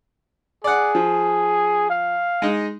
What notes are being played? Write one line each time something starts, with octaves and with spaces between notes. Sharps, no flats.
G#4 D5 F#5
F3
F5
G#3 D#4